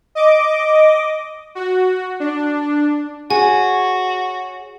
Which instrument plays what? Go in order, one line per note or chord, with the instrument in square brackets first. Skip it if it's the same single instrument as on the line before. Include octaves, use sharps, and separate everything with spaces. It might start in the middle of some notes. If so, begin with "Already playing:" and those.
[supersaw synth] D#5 D6
F#4
D4
[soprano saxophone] F#4 [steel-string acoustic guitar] G#4 C#5 [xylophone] G#5